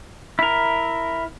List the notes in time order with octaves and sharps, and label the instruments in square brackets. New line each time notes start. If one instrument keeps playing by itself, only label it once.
[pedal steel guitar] E4 A#4